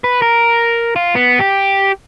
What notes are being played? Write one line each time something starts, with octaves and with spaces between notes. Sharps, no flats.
B4
A#4
F4
B3
G4